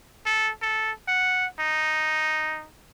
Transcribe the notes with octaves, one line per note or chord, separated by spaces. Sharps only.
A4
A4
F#5
D#4